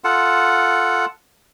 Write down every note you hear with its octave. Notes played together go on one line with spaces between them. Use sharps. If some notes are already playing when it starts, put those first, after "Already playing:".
F4 A4 F#5